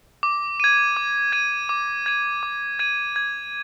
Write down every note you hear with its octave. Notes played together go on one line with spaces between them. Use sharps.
D6
G#6 D#7
D6
G#6 D#7
D6
G#6 D#7
D6
G#6 D#7
G#6